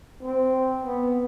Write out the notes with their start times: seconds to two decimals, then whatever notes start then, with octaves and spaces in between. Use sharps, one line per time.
0.22 C4
0.84 B3